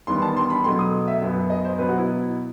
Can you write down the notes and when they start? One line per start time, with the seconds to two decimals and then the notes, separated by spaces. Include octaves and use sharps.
0.07 E2 D#3 G3 B3 C6
0.22 A5
0.37 C6
0.50 B5
0.64 B2 F#3 A3 C6
0.79 D#6
1.08 E5
1.22 F#2 F#3 B3
1.50 D#5
1.65 C5
1.78 B2 F#3 B3 B4
1.88 F#4
1.98 E4